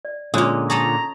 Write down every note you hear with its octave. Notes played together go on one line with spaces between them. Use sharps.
D5
A#2 D3 G#3 C#4 F4 C#5 D#6
G#4 A4 D#5 A#5 C#6